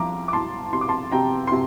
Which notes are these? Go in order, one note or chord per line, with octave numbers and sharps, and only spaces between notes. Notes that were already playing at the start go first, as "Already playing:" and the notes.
Already playing: C2 F3 F5 A#5 D6
D6
C2 A5 C6
C3 C6
D6
A5 C6
C3 G5 A#5
C6
C3